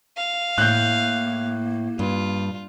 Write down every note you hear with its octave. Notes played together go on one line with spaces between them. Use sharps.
F5
A2 A#3 F#6 G6
G2 F4